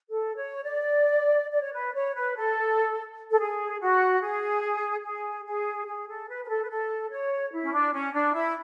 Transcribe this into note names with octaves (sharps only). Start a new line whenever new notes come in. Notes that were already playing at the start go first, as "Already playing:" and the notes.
A4
C#5
D5
D5
C#5
B4
C#5
B4
A4
A4
G#4
F#4
G#4
G#4
G#4
G#4
A4
B4
B4
A4
B4
A4
C#5
E4
C#4
D4
C#4
D4
E4